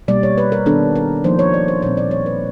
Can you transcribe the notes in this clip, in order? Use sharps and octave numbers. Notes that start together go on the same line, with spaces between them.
B2 G3 A#3 D5
C#5
B4
A#4
D#3 G3 B3 D4 A4
A#4
F3 A#3 D#4 C5
C#5
D5
C5
A#2 G3 C4 C#5
D5
C#5
B4